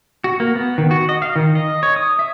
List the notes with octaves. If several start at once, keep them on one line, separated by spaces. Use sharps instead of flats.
F#4
A#3
B3
D#3
F#4
D#5
F5
D#3
D#5
C#5
D#6
E5